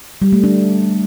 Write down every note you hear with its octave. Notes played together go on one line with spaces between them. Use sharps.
G3
A3
D4